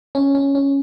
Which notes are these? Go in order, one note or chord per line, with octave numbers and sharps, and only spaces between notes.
C#4
C#4
C#4